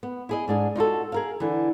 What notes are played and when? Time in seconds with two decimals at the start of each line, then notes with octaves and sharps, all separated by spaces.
0.03 B3
0.29 E4 G#4 D#5
0.48 G#2 D4 G#4
0.76 D#4 F4 F#4 A4
1.12 G#4 A#4 F5
1.40 D3 E3